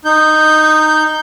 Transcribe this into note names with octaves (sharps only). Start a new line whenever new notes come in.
D#4 G6